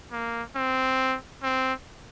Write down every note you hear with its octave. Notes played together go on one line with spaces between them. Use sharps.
A#3
C4
C4